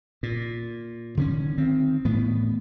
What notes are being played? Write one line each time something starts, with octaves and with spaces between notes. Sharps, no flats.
A#2
D3 D#3 A3 C#4
D#3 C4
A2 E3 B3